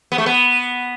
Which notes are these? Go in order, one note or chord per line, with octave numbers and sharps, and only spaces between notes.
B3
A3
B3